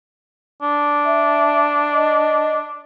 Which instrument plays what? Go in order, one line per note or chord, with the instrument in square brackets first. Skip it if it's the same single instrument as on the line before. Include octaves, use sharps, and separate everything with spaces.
[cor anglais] D4
[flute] E5
D#5